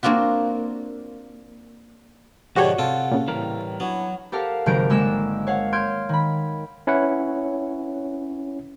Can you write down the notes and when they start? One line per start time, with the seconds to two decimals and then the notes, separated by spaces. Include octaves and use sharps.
0.03 A#3 C4 D4 F4 F#4
2.56 G#2 B2 D3 F3 F#4 G4 C#5 F#5
2.79 C3 F4 A4
3.11 A#2 C#3
3.28 A2 E3 G3 A#4
3.80 F#3 B3 D4 E4 F#4 C#5
4.32 G4 A4 A#4 F5 F#5
4.66 G#1 C#3 F#3 A#4 G6 D7
4.90 D3 G#3 A#3 E6 F#6 E7
5.47 C#5 F5 F#5
5.73 C6 F6 G6 G#6 D7
6.09 D#3 B5
6.87 C#4 E4 B4 C#5 F#5